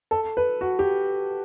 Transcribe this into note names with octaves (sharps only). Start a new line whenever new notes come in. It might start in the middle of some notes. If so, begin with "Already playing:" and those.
A4
B4
F#4
G4